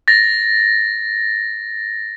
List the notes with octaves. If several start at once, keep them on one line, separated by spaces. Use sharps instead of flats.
A6 A#6